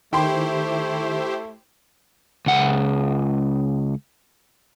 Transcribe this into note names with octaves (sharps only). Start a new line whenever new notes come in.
D#3 A3 E4 G4 C5 G5 C6
C#2 F#5